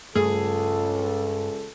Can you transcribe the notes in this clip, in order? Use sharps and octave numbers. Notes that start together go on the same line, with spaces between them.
C#2 G2 A3 G#4 A4